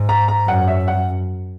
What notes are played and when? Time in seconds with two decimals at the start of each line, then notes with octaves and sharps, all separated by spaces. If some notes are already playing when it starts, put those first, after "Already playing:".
Already playing: G#2
0.09 A#5
0.28 A#5
0.47 F#2 F#5
0.68 E5
0.88 F#5